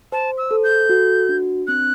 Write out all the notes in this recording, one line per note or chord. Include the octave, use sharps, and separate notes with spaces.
C5 A5
E6
A4
G6
F#4
D4
C4 F#6